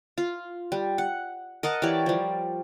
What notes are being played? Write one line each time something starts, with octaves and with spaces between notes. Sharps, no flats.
F4
G3
F#5
A#4 D#5 F#5 A5
E3 G4 C#5 D5
F3 G3